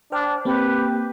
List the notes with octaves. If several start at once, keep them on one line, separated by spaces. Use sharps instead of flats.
D4 C5 G5 F6
A#3 C4 G4 B4